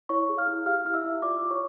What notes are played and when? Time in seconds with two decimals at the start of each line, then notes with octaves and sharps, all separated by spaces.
0.09 E4 C#5 C#6
0.29 G#4
0.37 F5 F6
0.48 E4
0.66 G4 F5 F6
0.85 E4 F6
0.94 E5 E6
1.04 E4
1.22 F4 D5 D6
1.42 F4
1.51 C#5 C#6